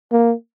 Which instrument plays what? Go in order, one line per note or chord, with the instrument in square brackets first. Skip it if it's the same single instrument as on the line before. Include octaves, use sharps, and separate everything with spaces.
[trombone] A#3